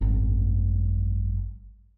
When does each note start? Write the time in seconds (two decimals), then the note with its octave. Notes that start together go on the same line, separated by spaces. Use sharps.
0.01 G#1 F#2